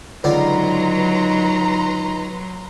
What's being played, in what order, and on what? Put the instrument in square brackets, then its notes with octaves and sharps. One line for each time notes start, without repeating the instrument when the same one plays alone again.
[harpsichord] C#2 D3 D4 [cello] F#3 [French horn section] D#4 [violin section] B4 A#5 C6